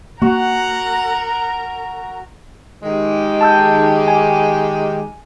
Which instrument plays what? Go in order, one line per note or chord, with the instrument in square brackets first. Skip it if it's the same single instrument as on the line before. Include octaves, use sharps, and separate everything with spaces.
[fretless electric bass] A#3 [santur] F#4 [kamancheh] A#4 A#5 [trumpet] F#5
[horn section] D#3 G#3 G4
[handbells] A5 E6 G6
G#5